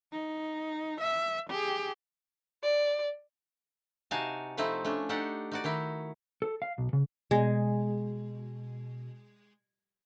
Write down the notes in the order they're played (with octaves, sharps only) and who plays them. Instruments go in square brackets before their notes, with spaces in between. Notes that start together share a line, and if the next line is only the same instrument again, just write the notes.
[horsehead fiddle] D#4
E5
G4 G#4
[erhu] D5
[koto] C3 D#4 F#4 F5 G#5 A5
F3 A3 C4 D#4 E4
A3 C#4 D4
D4 D#4 G4 A4 F#5
D#4 F#4 D5
D#3 D#4 E4
[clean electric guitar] A4
F5
B1
C#3
[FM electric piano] B2 [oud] G#3